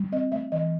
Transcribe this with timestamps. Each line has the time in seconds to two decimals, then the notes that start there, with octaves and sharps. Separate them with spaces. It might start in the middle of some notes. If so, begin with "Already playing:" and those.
Already playing: G3
0.12 C4 D#5
0.32 A3 E5
0.52 E3 D#5